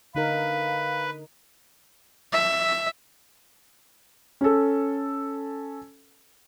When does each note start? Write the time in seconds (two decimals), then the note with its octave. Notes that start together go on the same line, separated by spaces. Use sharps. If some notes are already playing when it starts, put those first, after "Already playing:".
0.15 D3 D#4 A#4 B4 F5
2.32 E5
4.41 C#4 A4